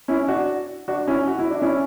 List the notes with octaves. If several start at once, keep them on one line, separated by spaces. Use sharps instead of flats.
C#4 E4
D4 F#4
D4 F#4
C#4 E4
F#4
E4
D4
C#4 E4